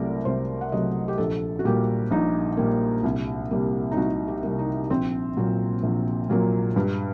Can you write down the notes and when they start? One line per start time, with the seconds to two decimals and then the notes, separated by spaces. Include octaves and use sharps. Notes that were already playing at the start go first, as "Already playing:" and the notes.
Already playing: C2 C3 F#3 A3 A#4 D5
0.25 C2 C5
0.61 F#5
0.72 C3 F#3 A3 D#5
1.08 G4
1.18 A#1 A4
1.59 F#4
1.65 A#2 G3 A#3 G4
2.11 A#1 D#4
2.57 A#2 G3 A#3
3.04 C2
3.51 C3 G3 A#3
3.92 D#4
3.97 C2 F#4
4.28 G4
4.43 C3 G3 A#3
4.59 D#4
4.90 A#1 C4
5.37 A#2 F#3 A#3
5.83 A#1
6.30 A#2 F#3 A#3
6.76 G2